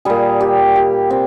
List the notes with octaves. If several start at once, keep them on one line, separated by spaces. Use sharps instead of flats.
A#2 G3 G#4
G4
G4
C4